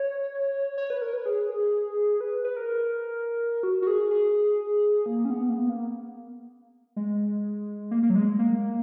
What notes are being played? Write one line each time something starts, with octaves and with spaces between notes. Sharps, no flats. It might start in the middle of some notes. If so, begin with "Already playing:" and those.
Already playing: C#5
C#5
B4
A#4
B4
G#4
B4
B4
A#4
F#4
F#4
G#4
G#4
A#3
C#4
B3
A#3
B3
A#3
G#3
A#3
A#3
F#3
G#3
A#3